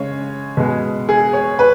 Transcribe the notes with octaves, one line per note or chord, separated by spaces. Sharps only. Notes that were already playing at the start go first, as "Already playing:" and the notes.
Already playing: C#3 G#3 C#5
B2 G#3
G#4
C#5
B4